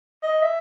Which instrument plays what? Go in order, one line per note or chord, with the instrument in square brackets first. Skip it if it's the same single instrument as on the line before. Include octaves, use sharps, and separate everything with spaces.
[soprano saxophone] D#5
E5